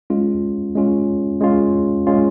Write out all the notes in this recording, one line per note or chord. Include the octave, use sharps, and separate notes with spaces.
G#3 C#4 F4
G#3 C#4 F4
G#3 C#4 F4
G#3 C#4 F4